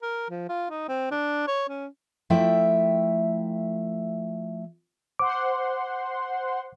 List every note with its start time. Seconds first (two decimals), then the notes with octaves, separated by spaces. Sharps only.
0.02 A#4
0.30 F3
0.49 F4
0.71 D#4
0.89 C4
1.11 D4
1.48 C#5
1.69 C#4
2.30 F3 A3 E4 E5 G5
5.19 C5 F#5 C6 D6